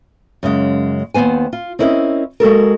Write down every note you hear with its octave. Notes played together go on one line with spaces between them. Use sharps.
F#2 C#3 G#3
D#2 D#3 B3 C5 G#5
F4
C4 C#4 E4 A#4 C5 D#5
G#3 F#4 A4 A#4